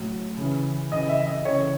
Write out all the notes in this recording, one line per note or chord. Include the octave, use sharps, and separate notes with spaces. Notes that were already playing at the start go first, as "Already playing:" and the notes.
Already playing: A2 F#3
C#3 E3
C#3 E3 D#5
E5
D#5
C#3 E3 C#5